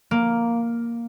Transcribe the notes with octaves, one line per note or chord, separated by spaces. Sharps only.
A#3